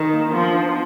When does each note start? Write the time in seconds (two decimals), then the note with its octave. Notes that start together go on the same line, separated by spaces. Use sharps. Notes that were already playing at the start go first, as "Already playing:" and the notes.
Already playing: D#3
0.14 A#3
0.28 D4
0.33 F3 B3
0.54 D4